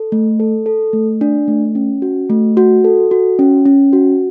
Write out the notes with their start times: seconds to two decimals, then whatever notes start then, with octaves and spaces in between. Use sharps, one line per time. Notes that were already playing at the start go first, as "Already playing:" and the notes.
Already playing: A4
0.12 A3
0.40 A4
0.66 A4
0.93 A3
1.21 D4
1.48 A3
1.75 C#4
2.02 F#4
2.30 A3
2.57 F#4
2.84 A4
3.11 F#4
3.39 C#4
3.65 C#4
3.93 F#4